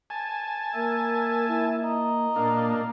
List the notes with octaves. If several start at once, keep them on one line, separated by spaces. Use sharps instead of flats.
G#5 A5
A#3 A#4 E5
E4
D#5 A#5
A#2 A#3 D4 F5